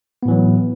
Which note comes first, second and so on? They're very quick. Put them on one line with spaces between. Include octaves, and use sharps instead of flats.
B3 A2 E3 F#3